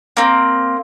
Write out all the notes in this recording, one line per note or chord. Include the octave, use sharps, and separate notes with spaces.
A#3 C4